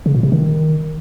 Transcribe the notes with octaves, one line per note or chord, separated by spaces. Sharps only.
C#3
A#2
C3
D#3